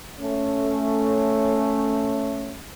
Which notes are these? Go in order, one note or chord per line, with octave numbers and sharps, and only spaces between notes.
A3 C#4